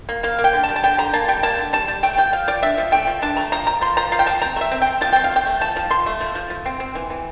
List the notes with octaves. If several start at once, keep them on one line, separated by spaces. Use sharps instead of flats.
A#3
A#3 F5
A#3
G5
D3
A5
G3
A5
D3 G5
D3 A#5
A#3 A5
G3 G5
A#3 A5
D3
G3 A5
G3
A3 G5
F3 G5
F3 F5
F3 D5
D4 E5
F3
A3 G5
F3
D4 A5
A3 A#5
F3 A#5
F3 A#5
F3 C6
F3 A#5
F3 F5
G5
F3 A5
C4 A#5
A3
E5
C4
C4 G5
F3 A5
C4 G5
F5
A3
G5
A3
F3 A5
F3
F3 C6
A3
F3
F3
F3
C4
C4
E3
E3